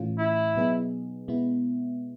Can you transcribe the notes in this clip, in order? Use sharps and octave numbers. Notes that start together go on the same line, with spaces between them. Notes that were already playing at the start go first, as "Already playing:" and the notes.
Already playing: A2 E3 A3 C#4 F4
E4
B2 F#3 B3 D#4 G#4
B2 G#3 B3 E4